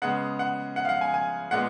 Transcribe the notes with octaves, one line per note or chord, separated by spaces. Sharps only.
C#3 G#3 B3 F#5
F#5
F#5
F5
F#5
G#5
G#5
A#2 G#3 B3 F#5